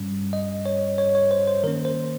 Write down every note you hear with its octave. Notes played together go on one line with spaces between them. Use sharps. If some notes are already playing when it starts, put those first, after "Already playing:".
Already playing: G2 G3 C#4
D#5
C#5
C#5
C#5
C5
C5
D#3 A#3 C#4 A#4
C5